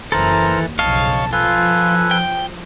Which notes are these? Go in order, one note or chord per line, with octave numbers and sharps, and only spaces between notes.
F#1 F#2 E3 A4 A#4 C5 A#5
D#2
B1 F2 C#3 C#5 D#5 F5 A5
F3 F4 A4 B4 G#5
G5